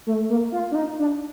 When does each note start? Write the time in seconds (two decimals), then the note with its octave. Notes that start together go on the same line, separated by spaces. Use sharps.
0.07 A3
0.30 A#3
0.52 F4
0.72 D4
0.75 D#4
0.99 D4